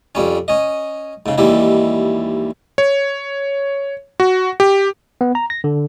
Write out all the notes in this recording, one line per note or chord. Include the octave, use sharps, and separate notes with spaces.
F2 G3 C#4
C#4 D#5
G#2 C#3
D#2 G#2 E3 G3 E4
C#5
F#4
G4
B3
A#5
A#6
D3